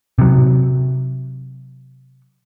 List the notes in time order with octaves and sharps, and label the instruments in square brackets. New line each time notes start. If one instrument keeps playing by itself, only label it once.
[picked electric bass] C3 F#3